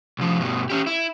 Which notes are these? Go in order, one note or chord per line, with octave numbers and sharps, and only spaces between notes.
C2 F3
G2 B2
C#4 G4
E4